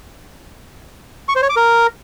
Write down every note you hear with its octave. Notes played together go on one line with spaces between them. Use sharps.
C#6
C5
C#5
D6
A#4